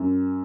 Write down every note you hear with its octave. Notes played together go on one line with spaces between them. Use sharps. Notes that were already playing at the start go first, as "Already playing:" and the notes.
Already playing: F#2